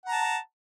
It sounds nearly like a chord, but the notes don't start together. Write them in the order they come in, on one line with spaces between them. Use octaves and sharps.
F#5 A#5 A5